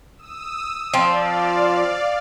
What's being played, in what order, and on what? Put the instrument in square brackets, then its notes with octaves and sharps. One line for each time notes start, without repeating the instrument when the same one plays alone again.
[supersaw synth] D#6 E6
[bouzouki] F3 C4 [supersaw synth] D5 F5